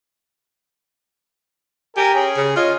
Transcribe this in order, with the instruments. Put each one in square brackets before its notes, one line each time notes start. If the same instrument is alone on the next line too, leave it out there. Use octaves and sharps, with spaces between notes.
[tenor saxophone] G4 [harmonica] A#4 G#5
[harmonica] C#4 G#4
[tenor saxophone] C#3
[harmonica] C#4 D#5 [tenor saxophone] F4